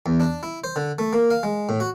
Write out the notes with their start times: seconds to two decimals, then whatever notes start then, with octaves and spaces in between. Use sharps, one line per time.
0.06 E2
0.20 D4
0.43 E4
0.64 C5
0.76 D3
0.99 A3
1.13 A#3
1.30 F5
1.43 G#3
1.69 A2
1.80 F#4